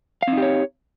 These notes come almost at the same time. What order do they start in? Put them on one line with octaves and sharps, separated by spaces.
F5 C4 D#4 G4 C#5